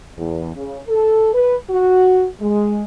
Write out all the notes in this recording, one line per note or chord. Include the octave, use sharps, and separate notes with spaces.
E2
C#3
A4
B4
F#4
G#3